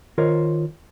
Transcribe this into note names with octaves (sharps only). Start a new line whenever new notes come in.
D#3 F4 A#4 C5 C#5 D#5